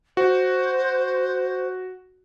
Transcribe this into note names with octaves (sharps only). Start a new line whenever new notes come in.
F#4 C5